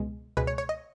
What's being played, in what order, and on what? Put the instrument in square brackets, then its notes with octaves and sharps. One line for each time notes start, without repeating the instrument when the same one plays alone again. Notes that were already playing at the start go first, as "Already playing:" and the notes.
Already playing: [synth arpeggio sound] C#2 B2 G#3
C#2 B2 G#3 B4
C#5
C#5
D#5